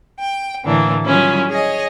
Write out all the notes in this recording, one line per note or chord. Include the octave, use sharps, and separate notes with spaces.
G5
A2 D3 E3 A#3 D4
D#3 F#3 G3 C#4 E4 F4
G#4 C#5 D#5